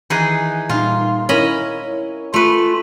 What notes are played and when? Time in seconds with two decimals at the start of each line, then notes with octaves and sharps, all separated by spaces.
0.10 D#3 E3 D#4 G#4 F#6
0.69 A#2 G3 D#4 F4
1.29 C#4 E4 A#4 C#5 D#5 B5
2.34 A3 F4 B4